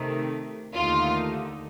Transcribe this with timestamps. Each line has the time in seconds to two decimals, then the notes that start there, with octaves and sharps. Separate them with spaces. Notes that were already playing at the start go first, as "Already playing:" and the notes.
Already playing: C3 D#3 A3
0.75 D#2 D3 A3 D#4 F4 F5